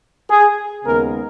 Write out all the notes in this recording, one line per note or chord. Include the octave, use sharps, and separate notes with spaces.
G#4
D#2 C#3 G#3 B3 A#4